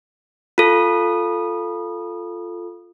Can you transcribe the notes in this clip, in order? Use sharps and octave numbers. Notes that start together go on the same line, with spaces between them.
F4 A4